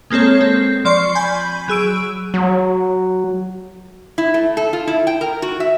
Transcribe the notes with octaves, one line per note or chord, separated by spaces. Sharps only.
G#3 A#3 C4 A4 C#5
C4
F3 D5 C6 C#6 C7
G#5 B5 G6
F#3 G#4 E6 D7
F#3
E4
A3
A4
F4
E4
G5
A#4
F#4
E5